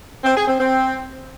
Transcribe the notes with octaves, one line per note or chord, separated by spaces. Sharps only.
C4
G#4
C4
C4